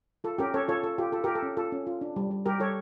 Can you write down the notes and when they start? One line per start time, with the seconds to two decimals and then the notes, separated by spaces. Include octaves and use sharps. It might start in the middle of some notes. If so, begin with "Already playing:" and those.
0.24 F4 A4
0.38 C#4 G4 A#4
0.54 C#4 A4 C#5
0.68 F4 A4 C#5
0.83 F4 A4
0.98 F4 G4
1.12 F4 A4
1.24 G4 A#4
1.28 F4
1.35 A4
1.42 C#4
1.57 F4 A4
1.72 C#4
1.87 F4
2.01 D4
2.16 G3
2.31 G3
2.46 G3 G4 A#4
2.60 G3 A4 C#5